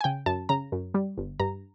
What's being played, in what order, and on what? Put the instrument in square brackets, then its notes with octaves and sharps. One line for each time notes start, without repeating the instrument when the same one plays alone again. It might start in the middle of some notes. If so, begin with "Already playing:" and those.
[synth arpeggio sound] G#5
C#3 G5
F#2 A5
C#3 A#5
F#2
G3
G1
G2 A#5